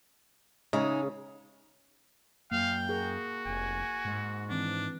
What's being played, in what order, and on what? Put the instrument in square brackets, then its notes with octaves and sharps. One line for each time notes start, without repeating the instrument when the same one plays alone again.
[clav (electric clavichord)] C#3 [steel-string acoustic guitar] G#3 D#4
[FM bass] F#2 [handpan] A#3 [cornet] F5 [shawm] G5
[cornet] F#4 [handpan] G#4 A#4
[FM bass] F1 [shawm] G#5
[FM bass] G#2
[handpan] D#3 E3 C4 [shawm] D4